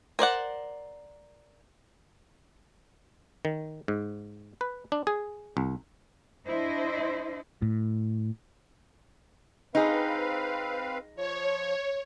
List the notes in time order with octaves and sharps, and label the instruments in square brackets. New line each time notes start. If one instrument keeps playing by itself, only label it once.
[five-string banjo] A#4 C5 D5 F#5
[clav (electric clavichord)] D#3
G#2
B4
D4
G#4
C2
[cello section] D4 E4 C5 D#5
[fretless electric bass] A2
[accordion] C4 B4 F5 [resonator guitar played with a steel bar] D#4 G#4
[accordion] F3 [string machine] C#5